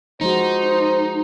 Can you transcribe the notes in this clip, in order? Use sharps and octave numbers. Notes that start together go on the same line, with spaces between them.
F3 G#3 D#4 F#4 C5